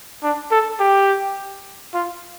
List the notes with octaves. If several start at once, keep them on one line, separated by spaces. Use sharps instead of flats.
D4
A4
G4
F4